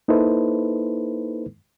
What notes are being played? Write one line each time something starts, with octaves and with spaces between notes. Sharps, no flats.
A#3 D#4 E4 A4 B4 C5